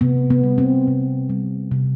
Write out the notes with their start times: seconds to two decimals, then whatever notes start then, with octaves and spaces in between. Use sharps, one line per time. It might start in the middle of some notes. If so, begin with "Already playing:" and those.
0.01 C3 B3
0.30 B3
0.44 G3
0.58 C4
0.87 C3
1.29 G3
1.71 C3